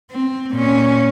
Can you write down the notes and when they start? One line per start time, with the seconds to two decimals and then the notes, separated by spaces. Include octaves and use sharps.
0.11 C4
0.52 A#2 C#4